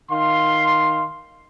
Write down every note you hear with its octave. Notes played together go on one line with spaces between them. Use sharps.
D#3 F5 C6